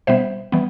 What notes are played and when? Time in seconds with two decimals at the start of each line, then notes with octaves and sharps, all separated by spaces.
0.07 B2 G3 B3 C5 E5
0.52 E3 G3 B3